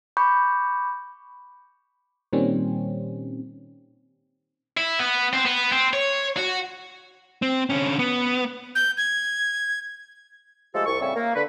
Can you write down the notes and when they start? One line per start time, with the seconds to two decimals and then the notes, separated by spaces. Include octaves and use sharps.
0.17 B5 C#6 D6 G6
2.33 A#2 D#3 G3 C4 C#4
4.77 E4
4.99 B3
5.33 C4
5.46 B3
5.72 C4
5.93 C#5
6.37 F#4
7.42 C4
7.70 D3 C#4
7.99 B3
8.75 G6
8.97 G#6
10.75 F3 G#3 A3 G4 A4
10.86 C2 C#6
11.01 A2 C#3 G3 C4 E5 C#6
11.15 A#3
11.35 D3 B4